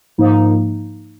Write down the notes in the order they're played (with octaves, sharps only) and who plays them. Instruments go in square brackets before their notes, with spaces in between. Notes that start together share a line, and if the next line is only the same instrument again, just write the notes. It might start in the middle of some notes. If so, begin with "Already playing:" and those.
[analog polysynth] G#2 F3 A#3 D#4